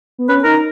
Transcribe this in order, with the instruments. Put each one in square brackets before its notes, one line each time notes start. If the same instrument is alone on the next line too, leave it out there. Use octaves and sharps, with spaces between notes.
[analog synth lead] B3
[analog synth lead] C#4 [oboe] B4
[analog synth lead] D#4 [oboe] A#4